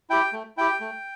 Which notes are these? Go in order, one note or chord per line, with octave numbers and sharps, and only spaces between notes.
E4 G4 G5
A3
E4 G4 G5
A3